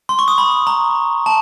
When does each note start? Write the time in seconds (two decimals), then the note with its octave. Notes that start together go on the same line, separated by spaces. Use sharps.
0.09 C6
0.19 C#6
0.28 D#6
0.38 B5
0.67 A#5
1.26 A5